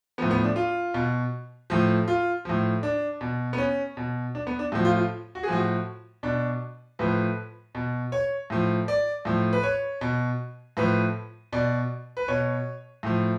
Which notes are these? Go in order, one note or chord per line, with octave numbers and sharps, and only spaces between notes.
A2 F3 B3
B3
D4
F4
B2
A2 F3
F4
A2 F3
D4
B2
B3
C#4
B2
D4
B3
D4
A2 F3 F#4
F4
F4
F#4
G#4
A2 F3 F#4
B2 D4
A2 F3 B4
B2
C#5
A2 F3
D5
A2 F3
B4
C#5
B2
A2 F3 B4
B2 D5
B4
B2 C#5
A2 F3